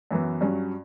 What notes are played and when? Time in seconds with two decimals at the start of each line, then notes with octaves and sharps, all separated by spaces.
0.11 F#2 E3 B3
0.41 G2 F#3 C#4